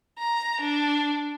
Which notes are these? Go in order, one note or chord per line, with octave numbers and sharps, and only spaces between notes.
A#5
D4